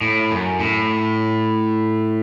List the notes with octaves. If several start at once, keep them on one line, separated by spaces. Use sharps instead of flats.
A2
F#2
A2